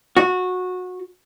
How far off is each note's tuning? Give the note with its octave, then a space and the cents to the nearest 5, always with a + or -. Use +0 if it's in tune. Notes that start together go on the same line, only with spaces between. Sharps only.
F#4 -20